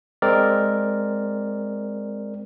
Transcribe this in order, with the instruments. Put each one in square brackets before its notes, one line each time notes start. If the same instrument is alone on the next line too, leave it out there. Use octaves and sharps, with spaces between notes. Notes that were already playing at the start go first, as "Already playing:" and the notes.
[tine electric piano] G#3 C4 A#4 D5